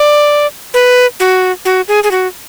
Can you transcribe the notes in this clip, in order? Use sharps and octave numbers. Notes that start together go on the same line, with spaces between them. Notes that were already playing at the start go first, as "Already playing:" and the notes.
Already playing: D5
B4
F#4
F#4
G#4
G#4
F#4